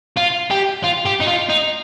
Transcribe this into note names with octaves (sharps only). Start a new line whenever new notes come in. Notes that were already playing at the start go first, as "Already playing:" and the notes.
F4
G4
F4
G4
D#4
F4
D#4